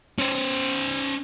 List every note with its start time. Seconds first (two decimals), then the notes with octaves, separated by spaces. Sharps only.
0.19 C#4 C5